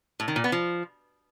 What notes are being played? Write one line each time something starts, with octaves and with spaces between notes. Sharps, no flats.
A2
D#3
A#2
B3
F3